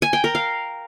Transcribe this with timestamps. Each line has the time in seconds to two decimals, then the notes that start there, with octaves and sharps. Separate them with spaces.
0.02 G#5
0.13 G5
0.24 A#4
0.35 F5